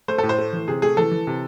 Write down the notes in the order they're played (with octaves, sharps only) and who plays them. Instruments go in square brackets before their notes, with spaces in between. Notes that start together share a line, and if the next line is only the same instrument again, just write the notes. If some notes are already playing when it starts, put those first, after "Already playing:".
[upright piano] A3 C5
A2 A4
C5
A3
E3
C3 G#4
A3 G#4
E3 A4
E3
C3